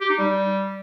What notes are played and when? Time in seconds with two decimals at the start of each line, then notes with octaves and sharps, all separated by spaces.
0.01 G4
0.10 D#4
0.18 G3